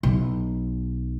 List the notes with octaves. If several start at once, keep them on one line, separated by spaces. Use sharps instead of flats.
B1